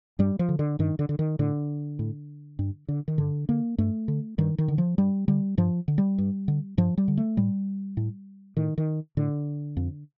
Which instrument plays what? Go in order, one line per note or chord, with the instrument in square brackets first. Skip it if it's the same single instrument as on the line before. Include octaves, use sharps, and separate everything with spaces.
[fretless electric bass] G2 G3
F3
D3
D3
G2 D#3
D3
D3
D#3
A2 D3
A2
G2
D3
D#3
G2 D3
D3 A#3
G2 A3
D3
G2 D#3
D#3
D3
F3
G2 G3
D3 G3
G2 F3
D3
G3
G2
D3
G2 F3
G3
D3
A3
A2 G3
A2
A2 D#3
D#3
A2 D3
F2